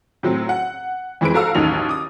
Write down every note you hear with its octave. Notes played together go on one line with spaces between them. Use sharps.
A2 F#3 C4
F#5
F2 E3 G#3 E4 B4 D7
F#4 A4 F5 A#5 E6
A1 D#2 F#3 D#4 F7
D6 D#6